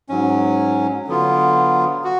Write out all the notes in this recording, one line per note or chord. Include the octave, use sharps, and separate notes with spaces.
G#2 F#3 C#4
D3 F#3 B3 F4
F#4